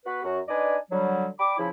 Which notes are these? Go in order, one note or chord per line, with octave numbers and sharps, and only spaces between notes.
B3 F#4 B4
F#2 F#4
D4 D#4 B4 D5 D#5 G#5
D3 F#3 G3
D5 G5 B5 D6
C#3 F3 E4